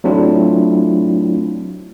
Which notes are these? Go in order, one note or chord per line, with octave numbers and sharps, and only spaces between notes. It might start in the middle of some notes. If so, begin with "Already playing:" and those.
F#3 A3 C4 D4 E4 F4